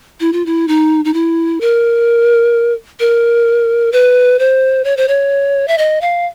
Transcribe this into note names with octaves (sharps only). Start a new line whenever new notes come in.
E4
F4
E4
D#4
D#4
E4
A#4
A#4
B4
C5
C#5
C5
C#5
E5
D#5
F5